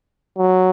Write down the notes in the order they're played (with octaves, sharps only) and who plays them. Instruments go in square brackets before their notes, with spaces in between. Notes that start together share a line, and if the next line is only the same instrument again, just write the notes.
[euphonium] F#3